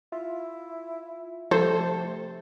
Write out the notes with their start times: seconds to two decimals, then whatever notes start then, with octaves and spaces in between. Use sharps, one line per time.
0.12 E4 F4
1.51 C3 F3 A3 A4 C5